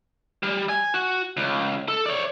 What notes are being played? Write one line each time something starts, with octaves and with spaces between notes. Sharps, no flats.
G3
G#5
F#4
C#2
A4
C#5 D5